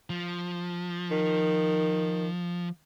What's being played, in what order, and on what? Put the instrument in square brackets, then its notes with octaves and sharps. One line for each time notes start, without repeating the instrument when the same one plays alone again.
[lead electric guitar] F3
[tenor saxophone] D#3